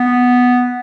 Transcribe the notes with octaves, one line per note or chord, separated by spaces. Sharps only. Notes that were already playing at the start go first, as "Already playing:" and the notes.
Already playing: B3